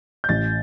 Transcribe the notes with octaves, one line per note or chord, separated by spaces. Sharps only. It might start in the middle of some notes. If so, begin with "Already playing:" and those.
G6
A1 A6